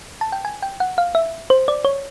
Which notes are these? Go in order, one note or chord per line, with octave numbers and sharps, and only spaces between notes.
A5
G5
G#5
G5
F#5
F5
E5
C5
D5
C#5